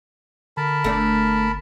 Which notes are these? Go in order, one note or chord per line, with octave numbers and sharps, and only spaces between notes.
D3 A#4 A5 B5
G1 A3 D4